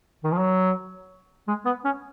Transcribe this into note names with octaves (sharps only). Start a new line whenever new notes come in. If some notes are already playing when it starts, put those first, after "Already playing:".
D#3
F3
F#3
G#3
B3
C#4